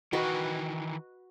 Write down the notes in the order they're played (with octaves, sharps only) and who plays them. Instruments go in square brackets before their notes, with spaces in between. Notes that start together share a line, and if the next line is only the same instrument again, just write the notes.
[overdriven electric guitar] D#3 E3 [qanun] F#4 B4 D#5